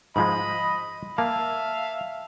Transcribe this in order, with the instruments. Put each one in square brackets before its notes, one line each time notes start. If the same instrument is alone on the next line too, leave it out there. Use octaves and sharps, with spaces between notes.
[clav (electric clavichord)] G#2 F3 G#3 [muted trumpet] D#5 [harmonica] B5
[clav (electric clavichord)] A#3 [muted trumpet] E5 [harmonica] F5 [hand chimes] A5